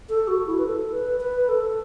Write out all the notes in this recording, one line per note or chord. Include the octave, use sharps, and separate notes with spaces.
A4
F#4
E4
B4
A4
B4
B4
A4